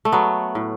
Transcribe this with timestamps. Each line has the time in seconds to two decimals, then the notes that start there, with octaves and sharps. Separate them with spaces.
0.05 A3
0.12 F#3 B3
0.55 A2